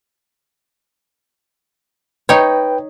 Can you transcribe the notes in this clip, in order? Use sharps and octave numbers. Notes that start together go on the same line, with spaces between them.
D#4 B4 C#5 G5